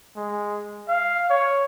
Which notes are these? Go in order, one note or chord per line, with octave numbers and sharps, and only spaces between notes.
G#3
F5
C#5